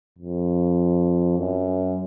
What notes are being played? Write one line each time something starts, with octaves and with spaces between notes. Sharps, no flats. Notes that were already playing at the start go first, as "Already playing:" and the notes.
F2
F#2